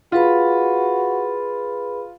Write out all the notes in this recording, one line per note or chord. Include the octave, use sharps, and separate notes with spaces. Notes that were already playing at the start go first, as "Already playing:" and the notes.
F4 F#4 G#4 B4 B5